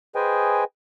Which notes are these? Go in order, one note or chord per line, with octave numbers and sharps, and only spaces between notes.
G#4 B4 C5 D#5 G5 G#5